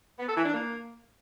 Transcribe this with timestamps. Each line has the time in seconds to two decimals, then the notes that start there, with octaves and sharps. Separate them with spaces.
0.19 B3
0.28 A4
0.37 E3
0.45 D4
0.54 A#3